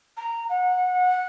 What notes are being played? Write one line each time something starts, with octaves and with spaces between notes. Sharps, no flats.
A#5
F#5